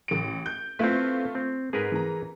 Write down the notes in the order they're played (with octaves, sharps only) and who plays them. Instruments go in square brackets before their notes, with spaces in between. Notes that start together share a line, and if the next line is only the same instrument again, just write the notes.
[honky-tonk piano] A1 D7
G6
[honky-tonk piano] A3 F4 [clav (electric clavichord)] C4 E4 B4
[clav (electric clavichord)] C4
[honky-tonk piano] G#2 [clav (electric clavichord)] G#4 A#4 B4
[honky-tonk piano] E3 A#5